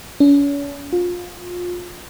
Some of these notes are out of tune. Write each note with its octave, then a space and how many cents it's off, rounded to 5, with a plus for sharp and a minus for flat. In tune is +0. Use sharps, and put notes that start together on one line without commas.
C#4 +40
F4 +25